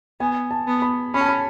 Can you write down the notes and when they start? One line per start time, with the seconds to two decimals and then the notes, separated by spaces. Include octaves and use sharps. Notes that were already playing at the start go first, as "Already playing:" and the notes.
0.20 B3 G#5
0.51 A5
0.67 B3
0.82 B5
1.14 C#4 B5
1.21 A5
1.29 B5